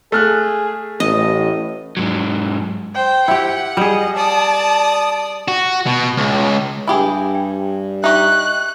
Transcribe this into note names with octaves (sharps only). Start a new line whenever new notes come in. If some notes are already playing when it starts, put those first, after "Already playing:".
A3 G#4 F6 F#6
A1 A2 D#5
G#2 F#3
C5 G5
E4 G4 F#5
G3 G#4 D#5
D5 A5 D#6
F#4
B2
C#2
G2 E4 G4 G#4
G5
D#4 G4 E5 C#6 F#6